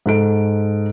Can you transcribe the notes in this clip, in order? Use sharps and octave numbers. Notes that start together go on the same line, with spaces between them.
G#2 A4 D7